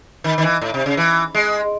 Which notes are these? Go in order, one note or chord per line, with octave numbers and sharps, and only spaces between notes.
D#3
D#3
E3
A2
C3
C#3
E3
G#3